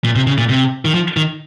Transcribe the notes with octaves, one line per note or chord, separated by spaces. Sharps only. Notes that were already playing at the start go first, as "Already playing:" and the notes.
A#2
C3
C#3
A#2
C3
D#3
F3
D#3